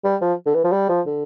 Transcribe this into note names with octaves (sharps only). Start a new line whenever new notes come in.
G3
F3
D3
E3
F3
G3
F3
D3